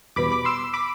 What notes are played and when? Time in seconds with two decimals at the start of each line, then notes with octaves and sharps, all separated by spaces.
0.16 E2 B2 G3 B3 B5 D6
0.31 B5 D6
0.45 C6 E6
0.74 B5 D6